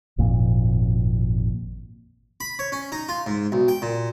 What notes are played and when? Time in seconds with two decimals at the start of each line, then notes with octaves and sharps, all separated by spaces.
0.18 G#1 F2 A#2
2.40 B5
2.59 C#5
2.72 C#4
2.92 D#4
3.09 F4
3.26 G#2
3.52 B1
3.68 G5
3.82 A#2